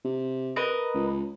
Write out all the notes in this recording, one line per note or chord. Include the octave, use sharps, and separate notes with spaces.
C3
A#4 B4 D#5
C#2